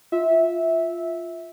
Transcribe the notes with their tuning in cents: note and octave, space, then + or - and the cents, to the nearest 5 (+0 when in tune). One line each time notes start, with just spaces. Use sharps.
F4 +0 E5 -15